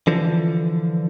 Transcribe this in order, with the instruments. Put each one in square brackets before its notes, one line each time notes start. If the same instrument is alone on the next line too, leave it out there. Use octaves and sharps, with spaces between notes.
[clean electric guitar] D3 E3 F3